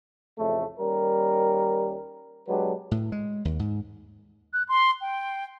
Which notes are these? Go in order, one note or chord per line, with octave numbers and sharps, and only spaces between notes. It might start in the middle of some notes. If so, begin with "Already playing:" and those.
A1 F2 C#3 A3
D#2 G3 C#4 A#4
B2 F#3 G#3 D4 G4 B4
A2
G#3
D#2
G#2
F#6
C6
G5